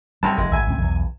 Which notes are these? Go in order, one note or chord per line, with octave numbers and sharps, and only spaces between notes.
B1 C3 G3 A5
F1 G#3
G#1 E5 G#5
C#2 A2 C4
B1 E2